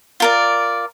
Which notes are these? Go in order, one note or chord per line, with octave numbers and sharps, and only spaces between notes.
F4 A#4 D5